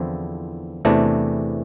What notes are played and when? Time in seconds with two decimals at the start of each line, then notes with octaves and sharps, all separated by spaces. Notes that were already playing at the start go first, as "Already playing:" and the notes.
Already playing: E2 D3 F3 C4 E4
0.85 E2 C3 E3 A3 D4